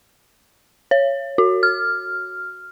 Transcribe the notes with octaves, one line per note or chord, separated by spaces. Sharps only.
C#5
F#4
F6